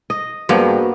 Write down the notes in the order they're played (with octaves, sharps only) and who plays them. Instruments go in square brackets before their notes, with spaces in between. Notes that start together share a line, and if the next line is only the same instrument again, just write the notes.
[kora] D#5
[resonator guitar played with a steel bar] G2 [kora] F#3 A#3 B3 [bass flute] F#4 [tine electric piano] G#4 B4 C5